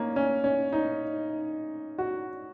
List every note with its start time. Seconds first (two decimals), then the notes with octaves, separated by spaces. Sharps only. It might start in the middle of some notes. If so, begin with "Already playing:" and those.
Already playing: A#3 C#4 D#4
0.16 C#4
0.44 C#4
0.72 D#4
1.98 F#4